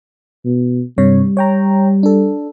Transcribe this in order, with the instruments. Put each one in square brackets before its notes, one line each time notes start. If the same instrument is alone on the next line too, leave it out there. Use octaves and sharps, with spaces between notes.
[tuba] B2
[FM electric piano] G2 C3 C#5 [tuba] G3
[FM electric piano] C#5 G5 A#5
D4 A4